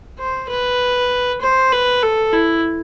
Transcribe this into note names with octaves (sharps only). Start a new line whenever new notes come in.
C5
B4
C5
B4
A4
E4